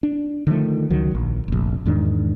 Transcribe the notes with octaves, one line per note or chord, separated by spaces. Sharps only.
D4
D3 D#3 F3 A3
C#2 D#3 F#3
A#1
F1 A#1
E2 G#2 D#3 D4